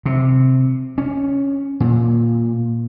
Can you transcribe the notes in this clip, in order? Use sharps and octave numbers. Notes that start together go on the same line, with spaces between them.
C3
C#4
A#2